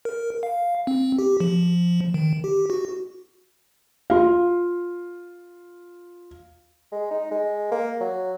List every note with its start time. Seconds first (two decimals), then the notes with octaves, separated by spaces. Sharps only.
0.05 A#4
0.43 F5
0.87 C4
1.19 G4
1.40 F3
2.14 D#3
2.44 G4
2.70 F#4
4.10 F4 F5
6.92 G#3
7.11 D#4
7.31 G#3
7.71 A#3
8.01 F#3